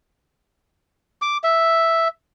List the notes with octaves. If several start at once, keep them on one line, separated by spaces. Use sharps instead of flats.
D6
E5